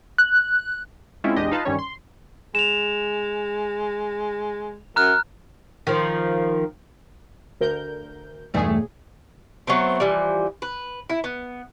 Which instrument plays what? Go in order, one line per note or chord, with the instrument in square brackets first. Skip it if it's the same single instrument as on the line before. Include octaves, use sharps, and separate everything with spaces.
[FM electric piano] F#6
[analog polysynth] G#3 C4 C#4 E4 F4
A#1 E2 G#3 D4 G4 D#5
D#4 F4 B4 F5 A5
A1 G2 D#3 G3 C#4 C#5
C6
[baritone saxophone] G#3 [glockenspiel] E7 F7
[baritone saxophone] F#2 [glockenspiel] A#5 F6 F#6
[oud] D#3 F3
[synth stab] D2 A#4 G6
[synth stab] B1 G#4 [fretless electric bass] E2 G2 [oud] G3 A3
[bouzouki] F#3 A3 B3 C4
E3 F3 G3
B4
E4
B3